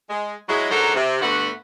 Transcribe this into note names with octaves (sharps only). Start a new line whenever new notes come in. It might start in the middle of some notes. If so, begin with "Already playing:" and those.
G#3
F#3 G#3 E4
G#2 F#3 D4 A4 A#4 C5
C3
G2 D3 A3 B3 F#4